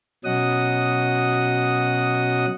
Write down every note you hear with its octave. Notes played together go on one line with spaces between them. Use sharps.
B2 F#3 C#4 D#5 F#5 D#6